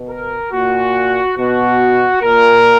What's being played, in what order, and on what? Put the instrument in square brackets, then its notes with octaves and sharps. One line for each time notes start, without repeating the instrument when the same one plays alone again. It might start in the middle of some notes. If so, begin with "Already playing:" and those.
Already playing: [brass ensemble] B2
A#4
A#2 F#4
B2 F#4
A#2 A#4